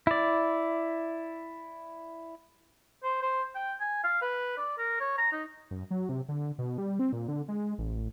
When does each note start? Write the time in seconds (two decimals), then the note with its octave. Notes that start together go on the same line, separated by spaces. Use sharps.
0.07 E4 D5
3.04 C5
3.22 C5
3.55 G5
3.80 G#5
4.04 F5
4.22 B4
4.58 D5
4.78 A#4
5.00 C#5
5.18 A#5
5.33 D#4
5.71 F#2
5.91 F#3
6.09 C3
6.28 D3
6.58 B2
6.78 G3
6.99 C4
7.13 A#2
7.28 D3
7.48 G#3
7.78 A1